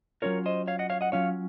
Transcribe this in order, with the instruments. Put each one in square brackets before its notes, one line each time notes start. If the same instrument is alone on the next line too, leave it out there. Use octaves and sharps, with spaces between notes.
[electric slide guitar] F#3 C#4 F4 A#4 C#5
C5 D#5
C#5 F5
D#5 F#5
C#5 F5
D#5 F#5
F#3 C#4 F4 C#5 F5